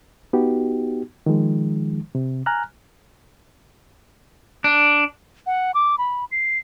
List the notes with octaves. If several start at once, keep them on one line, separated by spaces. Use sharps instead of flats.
B3 D#4 F#4 G4
D#3 F3 G#3
C3
G#5 A#5 F6 F#6
D4
F#5
D6
B5
C7